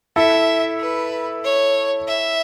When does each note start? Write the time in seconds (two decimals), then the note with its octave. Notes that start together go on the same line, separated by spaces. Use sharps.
0.16 E4 A4 E5
0.80 B4
1.44 C#5
2.08 E5